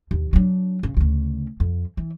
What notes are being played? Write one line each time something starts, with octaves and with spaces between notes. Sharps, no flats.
D#2
F#3 D4
C#3
D2 C#3
F2
E3